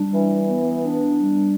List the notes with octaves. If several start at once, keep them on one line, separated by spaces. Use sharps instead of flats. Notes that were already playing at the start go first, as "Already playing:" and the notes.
Already playing: G3 D4
E3
B3
D4
G3